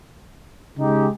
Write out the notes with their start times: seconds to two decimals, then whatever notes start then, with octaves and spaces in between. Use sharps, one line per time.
0.77 C#3 G#3 D#4 G4